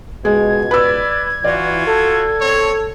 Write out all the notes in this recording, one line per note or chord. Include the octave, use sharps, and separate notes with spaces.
C#2 B2 G#3 G#6
B4 D5 E6
E3 F4 F#4 D5
A4
C4 C#5